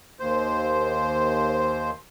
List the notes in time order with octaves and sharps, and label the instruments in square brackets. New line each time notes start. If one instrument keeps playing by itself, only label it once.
[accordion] D#2 C5